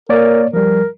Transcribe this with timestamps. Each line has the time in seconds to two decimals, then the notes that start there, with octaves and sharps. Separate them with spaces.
0.09 A#3 A#4 C#5 D5
0.53 F3 G3 A#4